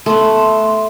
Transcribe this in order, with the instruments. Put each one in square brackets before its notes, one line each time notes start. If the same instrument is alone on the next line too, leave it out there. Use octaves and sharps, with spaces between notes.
[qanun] A3 B3 [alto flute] C6